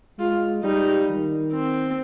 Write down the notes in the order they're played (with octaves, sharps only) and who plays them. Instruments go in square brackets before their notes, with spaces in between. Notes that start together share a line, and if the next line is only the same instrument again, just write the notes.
[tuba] G#3 [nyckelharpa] F4
[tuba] G3 [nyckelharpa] D#4
[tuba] D#3
[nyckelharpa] C4